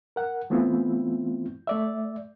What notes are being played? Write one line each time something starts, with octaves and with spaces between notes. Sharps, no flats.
A#4 F#5
E3 A3 B3 C4 E4 F4
A3 D5 E5